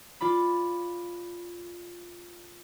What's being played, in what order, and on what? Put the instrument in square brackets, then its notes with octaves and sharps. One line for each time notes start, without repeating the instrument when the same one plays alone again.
[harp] F4 D5 B5